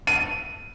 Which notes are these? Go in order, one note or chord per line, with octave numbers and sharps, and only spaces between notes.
D#7